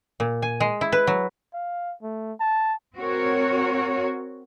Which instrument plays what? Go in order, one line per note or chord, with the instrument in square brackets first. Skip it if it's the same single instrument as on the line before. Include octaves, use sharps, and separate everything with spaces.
[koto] A#2
G#5
G#3
E4
B4
F#3
[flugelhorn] F5
A3
A5
[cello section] C4 F#4 A#4 C#5